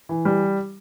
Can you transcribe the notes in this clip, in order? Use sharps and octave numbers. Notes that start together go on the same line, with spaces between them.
E3
G3